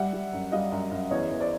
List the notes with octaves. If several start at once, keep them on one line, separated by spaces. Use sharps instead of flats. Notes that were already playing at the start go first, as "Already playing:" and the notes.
Already playing: G3 E5 F#5
G3
F#2
G3 D#5 F5
F#2
F#2
E2 C#5 D#5
E2
C5 D5